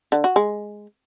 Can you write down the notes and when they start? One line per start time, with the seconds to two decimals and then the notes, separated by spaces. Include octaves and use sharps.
0.12 D3
0.24 F#4
0.36 G#3